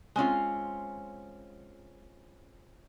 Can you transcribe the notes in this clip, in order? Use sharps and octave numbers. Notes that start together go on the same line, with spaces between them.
G#3 C4 C#4 F4